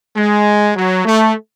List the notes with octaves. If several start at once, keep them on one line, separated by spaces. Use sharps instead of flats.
G#3
F#3
A3